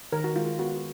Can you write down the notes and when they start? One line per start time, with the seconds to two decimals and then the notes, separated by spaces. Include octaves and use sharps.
0.12 D#3 A#4
0.24 F#4
0.36 G#3 F4
0.47 F4
0.59 B3 F#4